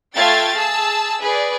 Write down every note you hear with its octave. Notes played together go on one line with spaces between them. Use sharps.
A3 F4 F5 G5 G#6 A6
G#4 A5 E6
G#4 B4 D5